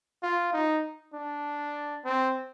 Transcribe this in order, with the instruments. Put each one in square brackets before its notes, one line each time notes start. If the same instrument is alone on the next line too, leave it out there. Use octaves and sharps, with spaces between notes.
[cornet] F4
D#4
D4
C4